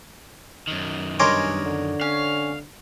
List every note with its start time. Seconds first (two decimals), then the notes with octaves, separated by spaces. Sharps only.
0.68 F#2 D#3
1.19 G2 A#4 C#5 D#5 G#5 C6 D6
1.65 D3
2.01 C#4 F5